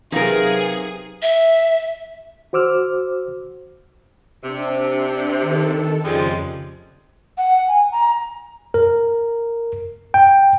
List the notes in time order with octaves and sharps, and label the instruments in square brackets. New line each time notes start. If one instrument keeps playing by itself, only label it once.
[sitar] F#2 C3 [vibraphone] F#3 B4 F5 [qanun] D#4 A#4 [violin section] G#4
[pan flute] E5
[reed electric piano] F#4 C5 D6 E6 F6
[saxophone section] C3 [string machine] D4
[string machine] D#3 A4
[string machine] F2 C#3 [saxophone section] F3 G3 G#3
[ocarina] F#5
G#5
A#5
[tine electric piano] A#4
G5